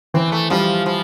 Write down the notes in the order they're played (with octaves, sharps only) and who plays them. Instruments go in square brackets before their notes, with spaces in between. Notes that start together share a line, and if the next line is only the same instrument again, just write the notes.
[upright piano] E3 [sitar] C4
[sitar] A3
[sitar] F3 [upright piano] G3
[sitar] F3